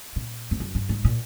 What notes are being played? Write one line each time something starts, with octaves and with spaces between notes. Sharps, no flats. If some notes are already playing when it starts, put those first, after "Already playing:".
A#2
G2
F#2
G2
G#2
A#2